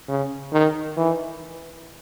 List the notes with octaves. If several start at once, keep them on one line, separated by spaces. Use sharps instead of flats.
C#3
D#3
E3